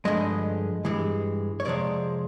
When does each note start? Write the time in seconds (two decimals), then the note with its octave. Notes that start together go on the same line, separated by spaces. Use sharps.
0.05 G2 D3 F3 G#3 D#5
0.85 G2 E3 G#3
1.60 C#5
1.65 F2 C3 F3 G#3 D5